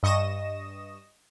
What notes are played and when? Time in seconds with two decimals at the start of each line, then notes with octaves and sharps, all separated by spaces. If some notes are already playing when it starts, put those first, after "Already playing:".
0.03 G2 D#5 C#6 D#6 A#6 E7